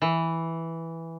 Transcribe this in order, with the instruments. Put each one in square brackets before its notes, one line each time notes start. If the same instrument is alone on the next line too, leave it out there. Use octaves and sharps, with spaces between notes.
[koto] E3